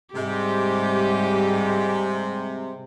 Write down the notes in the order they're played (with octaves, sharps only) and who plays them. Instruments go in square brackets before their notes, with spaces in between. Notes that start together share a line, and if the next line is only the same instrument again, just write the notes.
[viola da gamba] G#2 G3 [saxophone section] C3 [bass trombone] G#3 [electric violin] G4